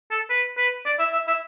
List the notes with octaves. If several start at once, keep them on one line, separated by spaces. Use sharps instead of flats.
A4
B4
B4
D5
E5
E5
E5